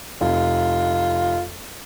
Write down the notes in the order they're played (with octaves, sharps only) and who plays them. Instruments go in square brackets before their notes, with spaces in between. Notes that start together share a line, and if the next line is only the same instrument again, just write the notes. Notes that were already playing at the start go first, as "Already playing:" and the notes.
[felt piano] F1 [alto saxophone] F4